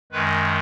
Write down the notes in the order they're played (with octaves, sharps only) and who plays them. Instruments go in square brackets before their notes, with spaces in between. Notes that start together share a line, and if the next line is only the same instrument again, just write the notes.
[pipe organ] F#2 D#3 G#3 B4